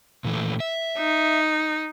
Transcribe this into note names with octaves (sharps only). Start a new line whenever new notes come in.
A#2 E3 A3
E5
D#4